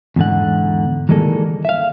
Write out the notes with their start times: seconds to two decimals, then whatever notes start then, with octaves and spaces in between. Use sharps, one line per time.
0.16 E2 G#2 D3 F#5
1.09 D#3 E3 G3 G#3 A#3 A4
1.65 E5 F5